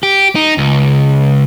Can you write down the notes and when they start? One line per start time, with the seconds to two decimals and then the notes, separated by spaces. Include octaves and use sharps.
0.03 G4
0.35 D#4
0.58 C#2